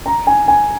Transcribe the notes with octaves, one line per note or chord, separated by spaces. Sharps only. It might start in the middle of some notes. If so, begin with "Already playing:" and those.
A#5
G#5
G#5